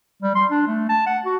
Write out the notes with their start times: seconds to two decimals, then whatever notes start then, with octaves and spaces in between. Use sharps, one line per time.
0.23 G3
0.35 C6
0.51 D4
0.67 A3
0.89 A5
1.07 F#5
1.25 F#4